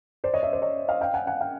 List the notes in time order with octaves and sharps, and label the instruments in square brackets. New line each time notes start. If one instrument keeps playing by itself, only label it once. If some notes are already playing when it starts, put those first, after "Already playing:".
[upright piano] C5 D5
C#5 D#5
D5 E5
C5 D5
C#5 D#5
D#5 F5
F5 G5
F#5 G#5
F#5 G#5
F5 G5